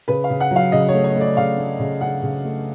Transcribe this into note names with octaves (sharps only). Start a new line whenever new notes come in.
C#3 B4
F5
C#3
F#5
F#3
F5
C#3 D#5
C#5
A3
C#5
A3 D5
C#3 F5
A3
C#3
C#3 F#5
C#3
A3